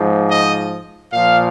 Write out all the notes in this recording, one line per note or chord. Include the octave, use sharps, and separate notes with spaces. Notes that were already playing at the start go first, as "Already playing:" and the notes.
Already playing: G#2 F3
D#5
A#2 F3 F5